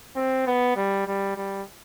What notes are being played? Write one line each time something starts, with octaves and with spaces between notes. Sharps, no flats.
C4
B3
G3
G3
G3